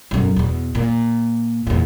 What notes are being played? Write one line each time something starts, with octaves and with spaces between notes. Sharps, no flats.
B1 F#2
E2 B2
A#2
E2 A#2